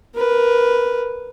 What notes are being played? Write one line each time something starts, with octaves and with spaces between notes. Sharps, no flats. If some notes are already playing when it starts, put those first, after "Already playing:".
A#4 B4